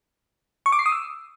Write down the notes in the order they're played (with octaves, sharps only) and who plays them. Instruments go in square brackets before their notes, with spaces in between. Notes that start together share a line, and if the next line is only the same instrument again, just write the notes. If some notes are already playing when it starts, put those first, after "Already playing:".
[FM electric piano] C#6
D6
C7
D#6
E6